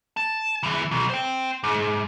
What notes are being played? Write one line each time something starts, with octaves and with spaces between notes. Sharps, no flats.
A5
E2 E3
B1
C5 G5
G#2